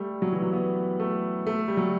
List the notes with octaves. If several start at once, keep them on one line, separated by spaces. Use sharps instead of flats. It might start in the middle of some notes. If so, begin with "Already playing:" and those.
Already playing: G3 A3
F#3
E3
F#3
B3
A3
A3
G3
F#3